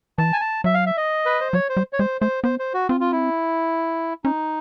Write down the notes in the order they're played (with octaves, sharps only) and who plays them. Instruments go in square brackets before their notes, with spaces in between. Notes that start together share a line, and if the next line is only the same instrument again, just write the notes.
[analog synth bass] E3 [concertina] A5
[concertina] G#5
A5
[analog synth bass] F#3 [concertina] E5
[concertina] F5
E5
D#5
B4
C5
[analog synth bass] F#3 [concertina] C#5
[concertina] C5
[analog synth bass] G3
[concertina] C#5
[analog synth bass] G#3 [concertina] C5
[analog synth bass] A3 [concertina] C5
[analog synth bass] B3 [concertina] C5
[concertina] C5
F#4
[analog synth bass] C4 [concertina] F4
[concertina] F4
E4
[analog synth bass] C#4 [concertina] D#4